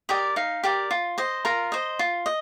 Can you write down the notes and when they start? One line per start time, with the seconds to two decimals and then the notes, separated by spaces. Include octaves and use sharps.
0.09 G4 A#4 D5 D#5
0.36 D#4 F5
0.63 G4 A#4 D5
0.91 F4
1.18 C5 D#5
1.45 F4 A#4 A#5
1.72 C5 D#5
1.99 F4
2.26 D#5